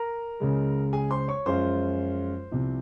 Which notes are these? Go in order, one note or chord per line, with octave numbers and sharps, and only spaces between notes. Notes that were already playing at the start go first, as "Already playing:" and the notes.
Already playing: A#4 A#5
C#2 C#3 G#3
G#4 G#5
C5 C6
C#5 C#6
F#2 F3 G#3 C#4 F4 C5 C6
C2 C3 F3